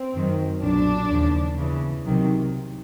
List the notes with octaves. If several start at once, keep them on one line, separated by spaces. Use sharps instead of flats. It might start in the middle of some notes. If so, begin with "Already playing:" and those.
Already playing: C4
F#2 D#3 F#3
B1 A#2 F#3 D4
D#2 C#3 F3
E2 C#3 E3
C2 C3 D#3 F#3